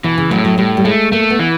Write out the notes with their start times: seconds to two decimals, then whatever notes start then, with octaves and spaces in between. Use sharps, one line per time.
0.04 B2 E3
0.18 C#3
0.31 A2 F#3
0.44 F#3
0.58 A2 G3
0.77 G3
0.85 G#3 A3
1.12 A3 A#3
1.30 B3
1.39 E3